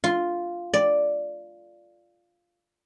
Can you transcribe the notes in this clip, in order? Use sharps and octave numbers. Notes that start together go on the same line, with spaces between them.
F4
D5